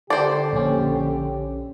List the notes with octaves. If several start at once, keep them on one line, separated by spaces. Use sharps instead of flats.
D3 G4 C5 D5
A#1 C#4